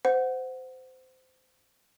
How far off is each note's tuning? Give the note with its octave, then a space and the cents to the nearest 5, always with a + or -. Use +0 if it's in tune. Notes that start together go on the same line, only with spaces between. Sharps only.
C5 -20 F#5 -5